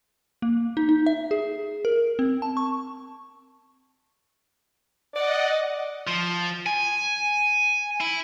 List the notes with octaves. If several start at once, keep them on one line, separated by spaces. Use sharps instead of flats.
A#3
D#4
D#4
E5
G#4
A#4
C4
A5
C#6
D5 D#5 F#5
F3
G#5
E4